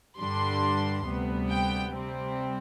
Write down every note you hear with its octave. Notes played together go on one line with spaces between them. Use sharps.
G2 D3 G3 D4 C6
D2 C3 G3 B3
G5
C3 G3 C4